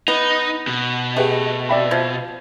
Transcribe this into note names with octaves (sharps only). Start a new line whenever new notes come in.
B3 D#4
B2
A3 G4 G#4 B4
D5 E5 B5
F3 G#6